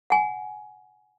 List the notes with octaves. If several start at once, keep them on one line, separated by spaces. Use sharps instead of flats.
F#5 G#5